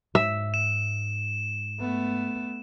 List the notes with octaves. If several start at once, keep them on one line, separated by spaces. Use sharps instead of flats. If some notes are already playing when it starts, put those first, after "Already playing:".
G#2 E5
E7
A3 B3